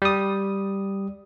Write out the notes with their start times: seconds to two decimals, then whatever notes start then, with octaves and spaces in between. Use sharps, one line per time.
0.02 G3 D#6